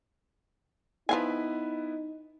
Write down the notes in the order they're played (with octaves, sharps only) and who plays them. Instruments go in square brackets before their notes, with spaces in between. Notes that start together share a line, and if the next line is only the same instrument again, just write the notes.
[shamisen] F3 F5 G#5 [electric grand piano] B3 E4 B4 [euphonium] D#4